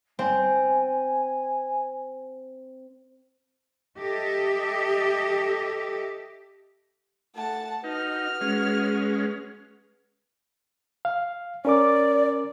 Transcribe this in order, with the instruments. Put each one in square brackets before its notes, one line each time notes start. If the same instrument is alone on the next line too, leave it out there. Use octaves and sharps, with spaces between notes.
[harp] C4 [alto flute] G#5
[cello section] G4 A4 D#5 E5
[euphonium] A3 [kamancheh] F#5 A5
[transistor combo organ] D#4 [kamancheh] F#4 F6 [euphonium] B4
[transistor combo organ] G#3 C#4
[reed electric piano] F5
[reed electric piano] C#4 A#4 D6 [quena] D5